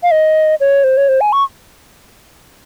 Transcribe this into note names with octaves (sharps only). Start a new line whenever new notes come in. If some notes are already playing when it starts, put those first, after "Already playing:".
F5
D#5
C#5
C5
C#5
C5
G#5
C#6